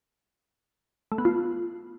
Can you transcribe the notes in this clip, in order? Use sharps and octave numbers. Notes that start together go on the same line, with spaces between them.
A3
B3
F4